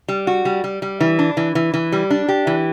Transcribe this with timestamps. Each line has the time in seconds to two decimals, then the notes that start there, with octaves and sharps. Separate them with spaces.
0.09 G3
0.27 F#4
0.45 G3
0.64 G3
0.82 G3
1.01 E3
1.19 D4
1.37 E3
1.55 E3
1.74 E3
1.92 G3
2.10 D4
2.28 G4
2.47 E3